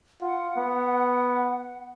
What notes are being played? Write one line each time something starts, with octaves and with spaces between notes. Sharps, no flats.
F4 F#5
B3